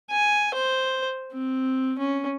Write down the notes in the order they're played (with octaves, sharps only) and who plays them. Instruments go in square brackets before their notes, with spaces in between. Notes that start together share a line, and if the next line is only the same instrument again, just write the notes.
[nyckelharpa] G#5
C5
C4
C#4